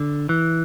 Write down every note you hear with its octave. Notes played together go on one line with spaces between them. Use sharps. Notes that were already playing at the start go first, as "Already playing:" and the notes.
Already playing: D3
E3